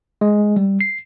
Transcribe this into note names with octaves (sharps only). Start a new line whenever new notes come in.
G#3
G3
C7